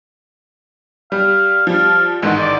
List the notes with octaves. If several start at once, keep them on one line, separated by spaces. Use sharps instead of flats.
G3 F5
F3 G3 F5
A1 G#2 D#3 F#5
D5